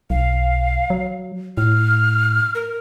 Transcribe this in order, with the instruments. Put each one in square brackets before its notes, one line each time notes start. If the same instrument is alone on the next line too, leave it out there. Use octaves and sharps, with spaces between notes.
[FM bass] B1 [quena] F5
[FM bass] F#3
[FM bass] A2 [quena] F6
[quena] A#4